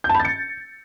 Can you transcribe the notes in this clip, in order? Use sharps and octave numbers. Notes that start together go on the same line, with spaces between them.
G6
A5
B5
A6
C#7